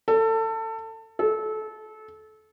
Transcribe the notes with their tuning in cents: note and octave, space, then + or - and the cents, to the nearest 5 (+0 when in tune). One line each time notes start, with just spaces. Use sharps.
A4 +25
A4 -25